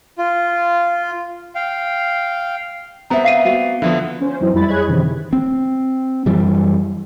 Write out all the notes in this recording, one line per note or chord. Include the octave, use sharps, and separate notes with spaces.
F4
F5 G5
B3 C4 C5 E5 A#5
F5 C7 D#7
A#3 F#4
D3 F3 B3 E4
C#4 C5
F#2 E3 C4 D#4 E4
F2 G3 E4 B5 A6
G#4 C#5 D#5 B5 F#6 G#6
F#2 C3 D#3 E3
C4
F#2 E3 G3